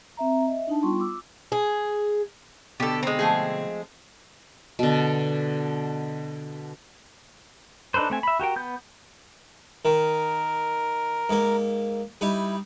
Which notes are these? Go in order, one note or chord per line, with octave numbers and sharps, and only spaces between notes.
C4 E5 A#5
D#5 E5
D4 D#4 A5
G3 B3 F4 C6 C#6
D6 E6
G#4
B2 D3 G4 A4
G#3 C4 A#5
F3 A3 G#4
B2 D3
D4 D#4 A4 B4 C5
A3 C4 G#5
E5 B5
F#4 G4 A#4 G5
B3 G6
D#3 A#4
G#2 A#3
G3 D#4 E4